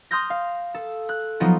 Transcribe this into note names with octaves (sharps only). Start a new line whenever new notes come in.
C6 D#6 F6 G6 A#6
F5
A4
F#6
F3 F#3 B3 D#4 F4